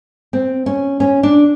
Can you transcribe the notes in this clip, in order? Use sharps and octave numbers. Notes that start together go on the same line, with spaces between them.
C4
C#4
C#4
D4